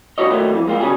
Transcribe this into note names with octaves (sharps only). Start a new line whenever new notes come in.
G2 C#3 G3 F#4 C#5 D#5
A#2 D#3 F#3 G3 A3 G4
F2 E3
G#3 A#3 F4 G5
B1 C#3 F#3 G3 G#4